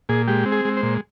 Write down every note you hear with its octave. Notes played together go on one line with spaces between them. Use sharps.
A#2 G#4
G#3 G4
C4
G#4
G#3
C5
A#2